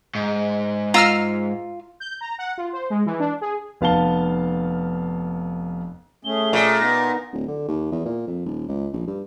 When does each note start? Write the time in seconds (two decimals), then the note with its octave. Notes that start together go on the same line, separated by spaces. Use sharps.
0.15 G#2
0.94 F4 A#5 E6 F6
2.00 G6
2.21 A#5
2.39 F#5
2.58 F4
2.73 C5
2.90 G#3
3.06 E3
3.20 D4
3.41 G#4
3.81 F1 B3 F5 A5 G7
6.25 A3 C#4 G#4 G7
6.53 A#2
6.79 B3 D#4 A#6
7.33 D1
7.48 D3
7.68 D#2
7.92 E2
8.05 A#2
8.27 F2
8.46 D#1
8.68 C#2
8.93 A#1
9.07 G2